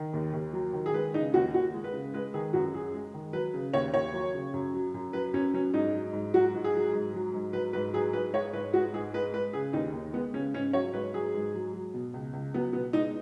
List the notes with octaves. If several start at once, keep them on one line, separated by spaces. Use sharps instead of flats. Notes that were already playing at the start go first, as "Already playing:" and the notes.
Already playing: D#3
D#2
D#2
F#3
D#3
G#4
G#3 B4
C#3 D#4
D#2 F#4
D#2 F#4
G#3
B4
C#3
G#3 B4
D#3 G#4
F#2 F#4
F#2 G#4
G#3
D#3
F#3 B4
C#3
D#2 C#5
D#2 C#5
F#3
C#3
F#2
F#3
F#2
F#3 B4
F#2 C#4
F#3 C#4
G#2 D#4
F#3
G#2
F#3 F#4
G#2
G#4
F#3
G#2
F#3
G#2
F#3 B4
G#2 B4
F#3 G#4
G#2 B4
G#3 C#5
G#2 B4
G#3 F#4
G#2 G#4
G#3 B4
G#3 B4
C#3 G#4
D#2 D#4
D#2
G#3 B3
C#3 C#4
G#2 C#4
F#3 C#5
G#2 B4
F#3 G#4
G#2
F#3
F#3
B2
C#2
C#2
F#3 B3
B2 B3
G#3 D#4